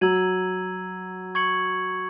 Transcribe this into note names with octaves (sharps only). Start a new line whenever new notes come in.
F#3 A#5 E6 G#6 D#7 F#7
C#6 G#6 C#7 F#7